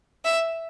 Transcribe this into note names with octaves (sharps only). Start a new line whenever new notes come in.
E5